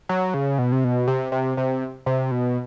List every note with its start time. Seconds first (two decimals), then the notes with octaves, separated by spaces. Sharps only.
0.09 F#3
0.34 C#3
0.58 B2
0.72 C3
0.84 B2
1.08 C3
1.32 C3
1.57 C3
2.06 C3
2.31 B2